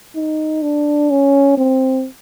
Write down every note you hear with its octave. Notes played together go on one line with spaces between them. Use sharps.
D#4
D4
C#4
C4